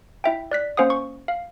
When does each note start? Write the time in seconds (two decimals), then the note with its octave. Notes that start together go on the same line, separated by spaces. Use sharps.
0.24 E4 E5 G5
0.51 D5 F#6 B6
0.77 A#3 C#4 C5 F5 F#5 D#6
0.90 C#6
1.28 F5